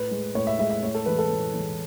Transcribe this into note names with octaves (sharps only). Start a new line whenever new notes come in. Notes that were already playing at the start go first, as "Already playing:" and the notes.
Already playing: A2 B4
G#3
A2 C#5
E5
G#3 E5
E5
A2 C#5
A4
E3 G#3 B4
A4
A2
E3 G#3